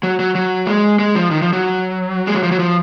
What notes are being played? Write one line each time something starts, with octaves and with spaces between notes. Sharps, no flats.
F#3
F#3
F#3
G#3
G#3
F3
D#3
F3
F#3
G#3
F#3
F3
F#3
F3